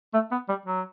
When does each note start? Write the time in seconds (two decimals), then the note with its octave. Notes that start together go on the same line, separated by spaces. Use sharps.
0.14 A3
0.31 B3
0.49 G3
0.66 F#3